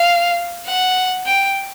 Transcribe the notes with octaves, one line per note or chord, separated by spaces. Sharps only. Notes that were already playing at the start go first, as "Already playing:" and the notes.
Already playing: F5
F#5
G5